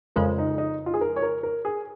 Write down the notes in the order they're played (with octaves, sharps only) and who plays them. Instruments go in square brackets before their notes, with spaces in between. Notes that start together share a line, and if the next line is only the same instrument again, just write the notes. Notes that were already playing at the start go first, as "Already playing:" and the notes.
[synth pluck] F2 C#3 G#3 [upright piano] A#4
[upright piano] D#4
D#4
F4
G#4
A#4
C#5
A#4
A#4
G#4